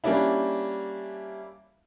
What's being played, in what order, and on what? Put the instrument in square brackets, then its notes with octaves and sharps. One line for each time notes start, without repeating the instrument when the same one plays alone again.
[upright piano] G3 A#3 C#4 D4 E4